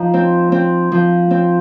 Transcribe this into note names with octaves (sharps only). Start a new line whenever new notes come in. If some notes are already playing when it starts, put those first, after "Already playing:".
Already playing: F3 D#4
C4
C4
F3
C4